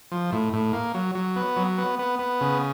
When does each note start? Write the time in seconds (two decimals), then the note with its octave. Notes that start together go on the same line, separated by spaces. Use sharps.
0.11 F3
0.32 A2
0.53 A2
0.73 A#3
0.94 F#3
1.15 F#3
1.36 B3
1.57 F#3
1.78 B3
1.99 B3
2.19 B3
2.41 C#3